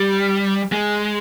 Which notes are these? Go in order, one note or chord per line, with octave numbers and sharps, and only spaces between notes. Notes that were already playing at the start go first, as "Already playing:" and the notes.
Already playing: G3
G#3